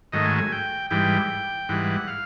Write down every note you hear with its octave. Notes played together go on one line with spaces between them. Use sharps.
G#2 D#3 F#3 A3 D#5
G#5
G#5
G5
G#2 E3 G3 G5
G#2 E3 G3 F#5
F5